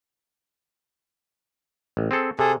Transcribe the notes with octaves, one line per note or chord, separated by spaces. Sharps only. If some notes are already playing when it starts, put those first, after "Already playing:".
A1
C4 G#4 A4
C3 G#4 A4